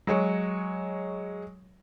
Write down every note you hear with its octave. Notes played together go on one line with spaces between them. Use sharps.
F#3 G#3 C#5